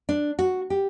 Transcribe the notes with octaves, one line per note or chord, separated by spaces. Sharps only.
D4
F#4
G4